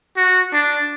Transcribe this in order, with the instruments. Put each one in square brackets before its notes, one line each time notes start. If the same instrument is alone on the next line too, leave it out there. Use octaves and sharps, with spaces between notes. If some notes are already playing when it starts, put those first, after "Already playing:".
[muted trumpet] F#4
D4